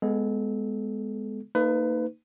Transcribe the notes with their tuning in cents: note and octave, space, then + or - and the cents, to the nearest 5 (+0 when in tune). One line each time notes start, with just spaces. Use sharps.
G#3 +0 B3 +5 A4 -25
A#3 -25 D#4 +0 B4 +25